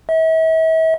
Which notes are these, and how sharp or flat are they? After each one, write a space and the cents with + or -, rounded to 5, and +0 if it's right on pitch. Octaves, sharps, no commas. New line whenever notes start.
E5 -40